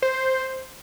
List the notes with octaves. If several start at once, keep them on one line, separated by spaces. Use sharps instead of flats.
C5